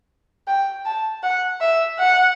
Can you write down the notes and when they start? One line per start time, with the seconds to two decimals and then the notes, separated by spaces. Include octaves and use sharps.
0.47 G5
0.85 A5
1.23 F#5
1.61 E5
1.99 F#5